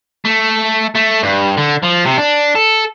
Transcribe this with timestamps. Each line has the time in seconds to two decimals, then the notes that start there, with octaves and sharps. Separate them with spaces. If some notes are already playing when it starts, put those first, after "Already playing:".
0.25 A3
0.95 A3
1.23 G2
1.58 D3
1.84 F3
2.06 C3
2.18 D4
2.55 A4